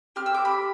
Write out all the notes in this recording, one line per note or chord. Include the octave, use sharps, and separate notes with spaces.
C4 G4 F6
E6
D6
B5